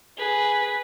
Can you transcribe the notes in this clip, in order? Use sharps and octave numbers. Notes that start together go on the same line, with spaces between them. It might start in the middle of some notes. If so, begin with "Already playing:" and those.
G#4 B4